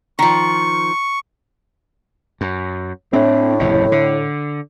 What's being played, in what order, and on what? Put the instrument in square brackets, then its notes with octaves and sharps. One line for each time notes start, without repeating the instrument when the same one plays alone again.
[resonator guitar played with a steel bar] D#3 F3 [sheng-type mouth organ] C#6
[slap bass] F#2
[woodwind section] A2 [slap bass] C4 D4
[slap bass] F#1 E2 C3
D3